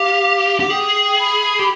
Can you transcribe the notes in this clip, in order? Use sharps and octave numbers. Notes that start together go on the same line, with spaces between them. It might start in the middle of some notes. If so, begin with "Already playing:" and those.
Already playing: G4 F5
G4 F#5
G#4 G5
B5
G4